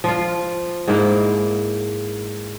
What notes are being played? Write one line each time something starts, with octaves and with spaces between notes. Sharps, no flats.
F3 F4
G#2 A#3 E4